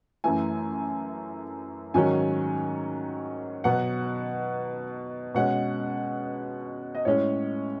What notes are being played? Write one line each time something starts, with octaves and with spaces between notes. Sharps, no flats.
F#2 E3 A3 G#5
G#2 D#3 F#3 C#4 G#5
B2 F#3 B3 F#5
B2 G#3 C#4 F#5
D#5
A2 G#3 C#4 C#5